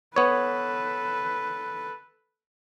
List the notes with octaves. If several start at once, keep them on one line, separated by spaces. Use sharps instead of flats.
B3 A4 B4 C#5